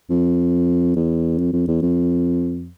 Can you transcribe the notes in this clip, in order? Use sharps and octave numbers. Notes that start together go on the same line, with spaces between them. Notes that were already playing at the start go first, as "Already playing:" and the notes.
F2
E2
F2
F2
E2
F2